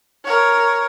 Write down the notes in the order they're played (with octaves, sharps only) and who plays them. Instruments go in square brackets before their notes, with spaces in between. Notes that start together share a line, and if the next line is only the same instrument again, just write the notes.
[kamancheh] A#4 C#5